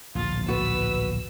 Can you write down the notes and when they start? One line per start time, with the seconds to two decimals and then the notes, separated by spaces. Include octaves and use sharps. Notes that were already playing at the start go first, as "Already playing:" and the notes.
0.15 D1 A#1 F4 A6
0.48 B3 F#4 B4 E6